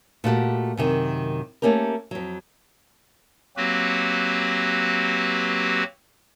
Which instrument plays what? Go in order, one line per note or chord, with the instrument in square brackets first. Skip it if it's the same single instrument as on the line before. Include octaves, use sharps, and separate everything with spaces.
[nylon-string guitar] A#2 A3 F#4 G4
F#2 C3 D#3
A3 A#3 C#4 G4 A#4
F2 F#3
[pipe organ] F#3 A#3 C4 F#4 G4 B4